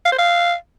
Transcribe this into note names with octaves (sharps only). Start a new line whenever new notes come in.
F5
C5
F5